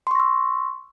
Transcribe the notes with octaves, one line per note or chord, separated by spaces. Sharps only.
C6 C#6 E6 A#6